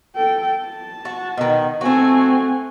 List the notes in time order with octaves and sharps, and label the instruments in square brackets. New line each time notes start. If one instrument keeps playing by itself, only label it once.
[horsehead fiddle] A4 G5
A5
[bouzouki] F#4
B2 D#3
[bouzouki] A3 F#4 [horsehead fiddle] C4 G#5